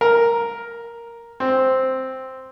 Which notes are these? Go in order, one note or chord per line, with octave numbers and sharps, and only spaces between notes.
A#4
C4